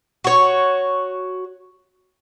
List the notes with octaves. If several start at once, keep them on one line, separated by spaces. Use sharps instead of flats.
F#4 C#5